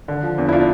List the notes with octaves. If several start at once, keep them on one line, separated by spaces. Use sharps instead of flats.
D3
F3
E2 D4
E4
D4 F4